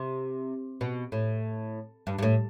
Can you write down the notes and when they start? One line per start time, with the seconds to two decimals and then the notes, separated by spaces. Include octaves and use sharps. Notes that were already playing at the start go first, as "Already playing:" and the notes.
Already playing: C3
0.81 B2
1.12 A2
2.07 G2
2.18 G2
2.22 A2